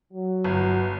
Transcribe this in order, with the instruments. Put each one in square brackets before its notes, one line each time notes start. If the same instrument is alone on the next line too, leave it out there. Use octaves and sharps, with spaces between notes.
[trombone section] F#3
[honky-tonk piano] G1